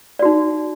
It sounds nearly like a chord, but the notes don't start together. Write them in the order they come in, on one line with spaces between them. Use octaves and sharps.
D5 F#4 D#4